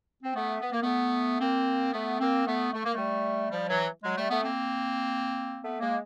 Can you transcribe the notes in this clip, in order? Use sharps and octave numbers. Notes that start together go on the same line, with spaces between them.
C4
A3 B3
B3
A#3
A3 B3
A#3 C4
A3 B3
A#3 C4
A3 B3
A3
A#3
G3 A3
F3 G3
E3 F#3
F#3 G#3
G3 A3
A3 B3
A#3 C4
A3 B3
G#3 A#3